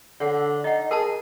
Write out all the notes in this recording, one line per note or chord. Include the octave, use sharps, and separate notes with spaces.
D3 C#5 F#5
D#4 D#5 F#5
G#4 A#4 A5